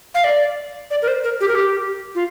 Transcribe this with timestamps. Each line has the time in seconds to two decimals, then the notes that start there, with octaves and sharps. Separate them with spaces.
0.15 F5
0.24 D5
0.91 D5
1.02 A#4
1.08 C5
1.24 A#4
1.41 G4
1.48 A#4
1.55 G4
2.15 F4